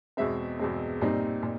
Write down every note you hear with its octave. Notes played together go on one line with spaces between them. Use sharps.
E2 B2 G#3 C4 E5
E2 B2 G#3 C4
A#2 G3 C4 D#4
A#2